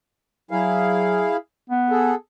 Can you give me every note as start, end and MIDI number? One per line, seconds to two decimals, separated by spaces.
0.51 1.28 54
0.51 1.37 64
0.51 1.37 68
0.51 1.37 77
1.70 2.13 59
1.90 2.15 68
1.90 2.15 69